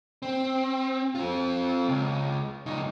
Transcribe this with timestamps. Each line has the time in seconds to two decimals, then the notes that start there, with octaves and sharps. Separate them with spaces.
0.22 C4
1.15 C4 F4
1.89 C#2
2.66 C#2 D#4